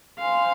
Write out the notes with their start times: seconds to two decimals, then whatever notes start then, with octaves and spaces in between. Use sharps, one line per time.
0.19 C5 F5 G#5 C6